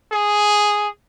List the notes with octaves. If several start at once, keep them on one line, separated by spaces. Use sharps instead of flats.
G#4